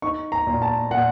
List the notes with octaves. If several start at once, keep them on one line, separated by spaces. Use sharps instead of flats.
D#4 C#6
A#5
A#2
A5
A#2 F#5